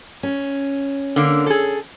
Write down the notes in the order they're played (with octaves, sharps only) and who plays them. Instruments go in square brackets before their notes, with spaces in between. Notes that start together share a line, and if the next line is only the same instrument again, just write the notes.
[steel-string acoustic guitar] C#4
[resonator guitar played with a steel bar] D3 A#3
G#4 A4